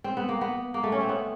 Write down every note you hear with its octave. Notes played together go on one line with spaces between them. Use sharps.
C4
B3
A#3
B3
A#3
A3
C#4
C4
B3